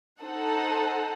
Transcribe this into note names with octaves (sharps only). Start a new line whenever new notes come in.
D#4 A4 C5 F#5